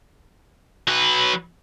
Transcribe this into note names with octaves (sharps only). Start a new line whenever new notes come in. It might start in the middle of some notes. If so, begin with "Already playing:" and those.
F#3 B4